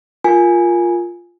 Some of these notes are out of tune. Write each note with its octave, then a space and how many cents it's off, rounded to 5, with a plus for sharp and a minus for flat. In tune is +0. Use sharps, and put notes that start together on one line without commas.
F4 +0 A#4 +0 G#5 +0